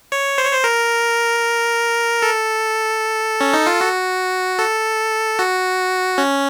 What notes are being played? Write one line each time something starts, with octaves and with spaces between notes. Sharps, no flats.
C#5
C5
C#5
C5
A#4
A4
C#4
D#4
F4
F#4
A4
F#4
C#4